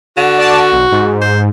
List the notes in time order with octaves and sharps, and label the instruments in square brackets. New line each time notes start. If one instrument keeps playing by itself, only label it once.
[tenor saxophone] D3 [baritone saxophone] F#4
[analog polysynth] D5 A5
B1
G#2
[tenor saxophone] C5